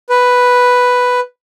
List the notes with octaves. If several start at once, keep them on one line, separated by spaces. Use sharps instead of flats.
B4